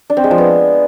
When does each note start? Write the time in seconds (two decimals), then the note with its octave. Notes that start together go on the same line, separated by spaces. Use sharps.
0.10 D4
0.17 C4
0.24 G#3
0.31 F3
0.38 B3